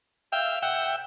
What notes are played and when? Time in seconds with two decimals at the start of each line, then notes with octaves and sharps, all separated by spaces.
0.32 E5 F5 G5
0.62 E5 F#5 G5